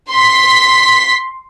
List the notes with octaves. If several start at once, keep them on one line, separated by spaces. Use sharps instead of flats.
C6 B6